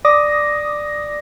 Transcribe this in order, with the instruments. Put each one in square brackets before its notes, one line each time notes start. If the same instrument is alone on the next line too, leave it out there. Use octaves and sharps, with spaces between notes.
[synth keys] D5 D6 D#6 A#6